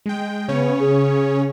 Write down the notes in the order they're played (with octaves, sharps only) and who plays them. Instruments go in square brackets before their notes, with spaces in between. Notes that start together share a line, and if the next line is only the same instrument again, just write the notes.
[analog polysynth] G#3 G5
[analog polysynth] C#3 C#4 C#5 [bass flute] B3
[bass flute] G#4